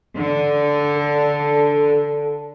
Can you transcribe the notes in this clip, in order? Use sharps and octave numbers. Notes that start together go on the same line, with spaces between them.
D3
A4